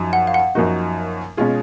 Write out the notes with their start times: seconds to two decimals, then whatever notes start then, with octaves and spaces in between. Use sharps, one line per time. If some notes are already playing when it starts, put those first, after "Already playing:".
Already playing: F#2 F3 D#4 F#4
0.13 F#5
0.27 F5
0.34 F#5
0.55 F#2 F3 A#3 D#4 F#4
1.37 B2 G#3 C#4 F4 G#4